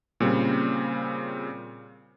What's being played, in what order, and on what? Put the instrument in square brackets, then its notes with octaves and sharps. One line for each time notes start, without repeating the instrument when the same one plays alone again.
[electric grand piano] A#2 C#3 G3 C4